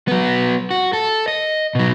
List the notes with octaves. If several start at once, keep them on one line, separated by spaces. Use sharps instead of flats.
F#3 B3
F#4
A4
D#5
B2 F#3